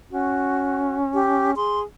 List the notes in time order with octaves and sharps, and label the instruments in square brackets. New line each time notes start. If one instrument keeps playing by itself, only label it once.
[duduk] C#4 [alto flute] F#4
[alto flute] G4
[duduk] G#4 [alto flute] C6